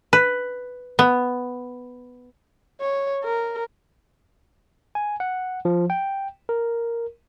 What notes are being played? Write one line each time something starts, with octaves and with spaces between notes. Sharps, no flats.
B4
B3
C#5
A#4
G#5
F#5
F3
G5
A#4